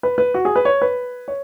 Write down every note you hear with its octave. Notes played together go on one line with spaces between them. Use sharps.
B4
B4
F#4
G#4
B4
C#5
B4
C#5